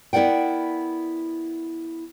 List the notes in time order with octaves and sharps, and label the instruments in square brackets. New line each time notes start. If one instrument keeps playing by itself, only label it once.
[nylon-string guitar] B3 E4 A#4 D5 F#5 G5